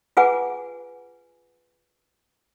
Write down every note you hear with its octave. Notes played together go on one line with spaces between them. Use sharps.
F4 G#4 B4 F#5 G#5 D6